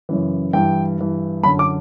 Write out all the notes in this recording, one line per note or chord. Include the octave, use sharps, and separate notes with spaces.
F#2 C#3 E3
G2 E3 G5
G2 E3
F#2 D3 B5
D6